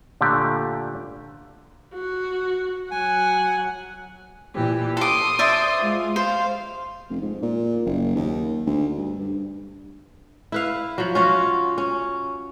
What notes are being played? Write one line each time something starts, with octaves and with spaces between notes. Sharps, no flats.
A#2 D3 A3 G4
F#4
F#3 F#5 G#5
A#2 E3 G4
A4 C6 D6 D#6
C5 D5 E5
G#3 F4
C5 F5
F1
G#2
A#2
F#1
D#2
D2
G2
G2
E4 B4 F5
F3 F#3
C#4 F4 F#4
C#4